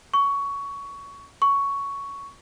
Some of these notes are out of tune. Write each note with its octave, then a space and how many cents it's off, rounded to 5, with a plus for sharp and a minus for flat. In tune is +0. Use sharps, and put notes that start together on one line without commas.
C#6 +15
C#6 +10